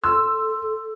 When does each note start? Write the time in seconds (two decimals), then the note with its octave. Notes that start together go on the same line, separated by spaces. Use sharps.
0.04 A4 C6 E6